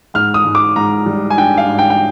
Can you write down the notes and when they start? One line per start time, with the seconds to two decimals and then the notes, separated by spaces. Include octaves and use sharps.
0.14 G#2 F6
0.34 D#6
0.45 G#2
0.55 D6
0.76 G#2 A#5
1.06 G3
1.30 G#5
1.38 D4 G5
1.57 F5
1.68 G#2
1.78 G5
1.90 G5